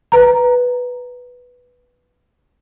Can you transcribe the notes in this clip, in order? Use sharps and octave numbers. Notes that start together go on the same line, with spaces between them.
B4 A#5